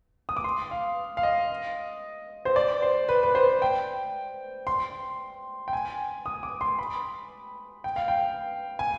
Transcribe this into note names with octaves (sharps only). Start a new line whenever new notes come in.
D#6
D6
C6
F5
F5
D#5
C5
D5
C5
B4
B4
C5
G5
C6
G5
G#5
D#6
D6
C6
B5
G5
F5
G5
G#5